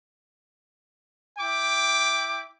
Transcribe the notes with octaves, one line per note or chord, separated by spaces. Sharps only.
E4 G5 D6